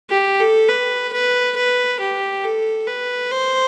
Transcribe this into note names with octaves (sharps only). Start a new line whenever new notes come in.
G4
A4
B4
B4
B4
G4
A4
B4
C5